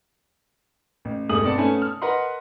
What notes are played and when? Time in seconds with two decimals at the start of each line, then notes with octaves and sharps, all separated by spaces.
1.05 A1
1.29 E1 G2 A3 G#4 D#6 F#7
1.43 G1 B3 C4 D5 A5 C#7
1.58 A3 B3 C#4 G#5 A5
1.82 F6
2.02 A#4 B4 D#5 F#5 A#5 C6